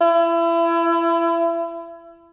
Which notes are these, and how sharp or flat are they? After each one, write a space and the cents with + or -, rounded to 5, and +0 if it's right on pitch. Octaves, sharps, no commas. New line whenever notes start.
E4 +30